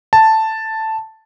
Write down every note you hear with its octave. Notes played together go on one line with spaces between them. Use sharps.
A5